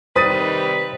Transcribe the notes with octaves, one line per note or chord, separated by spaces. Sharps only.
C3 D#3 G3 B4 C5 D#6 A6 D#7